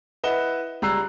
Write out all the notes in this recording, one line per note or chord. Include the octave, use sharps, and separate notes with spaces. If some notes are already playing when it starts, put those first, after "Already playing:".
E4 B4 D#5 F#5 E7 G7
C#2 G3 A#5 E6 F#6 C7